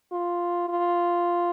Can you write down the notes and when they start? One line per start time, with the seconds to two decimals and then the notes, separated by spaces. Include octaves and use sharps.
0.12 F4
0.69 F4